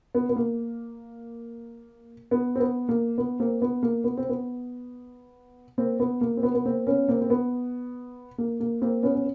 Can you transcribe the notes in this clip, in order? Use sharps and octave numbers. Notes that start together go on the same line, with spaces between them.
B3
B3
A#3
B3
C4
B3
A#3
B3
A#3 C4
B3
A#3
B3
C4
B3
A#3 C4
B3
A#3
C4
B3
B3
A#3 C4
B3 C#4
A#3 C4
C4
B3
A#3
A#3
A#3 C4
B3 C#4
C#4